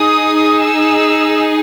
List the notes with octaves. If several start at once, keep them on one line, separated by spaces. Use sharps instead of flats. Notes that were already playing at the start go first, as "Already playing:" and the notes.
Already playing: D#4 G#4 D#6
E6